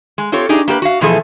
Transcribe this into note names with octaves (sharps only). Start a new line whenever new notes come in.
G#3
C4 F4 G4 A4 C#5
D4 D#4 G4 G#4
A#3 G4 A4 B4
F#4 F5
B2 E3 F3 A3 G#4 A4